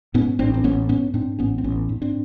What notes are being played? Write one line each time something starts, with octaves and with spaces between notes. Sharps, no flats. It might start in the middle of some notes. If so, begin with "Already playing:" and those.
G#2 B3 C#4
A1 C4 D4
C4
A1 B3 C#4
G#2 B3 C#4
G#2 C4 D4
A1 B3 C#4
C4
A1 B3 C#4
G#2
C4 D4